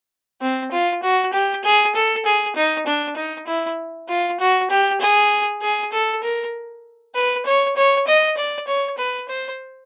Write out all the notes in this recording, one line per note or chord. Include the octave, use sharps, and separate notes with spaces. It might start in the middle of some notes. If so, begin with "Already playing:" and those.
C4
F4
F#4
G4
G#4
A4
G#4
D#4
D4
D#4
E4
F4
F#4
G4
G#4
G#4
A4
A#4
B4
C#5
C#5
D#5
D5
C#5
B4
C5